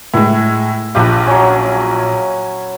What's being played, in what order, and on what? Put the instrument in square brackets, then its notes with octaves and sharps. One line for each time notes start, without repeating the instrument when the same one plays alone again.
[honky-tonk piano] A2 G#3 [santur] E4
[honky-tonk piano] A#1 F4 [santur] G4 B4
[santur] F#3 C#4